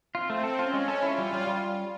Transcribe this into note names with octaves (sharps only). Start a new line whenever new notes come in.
C4 F4
A3
A4
C#4 F4
G#3
A4
E4 F4
G3
G3
G3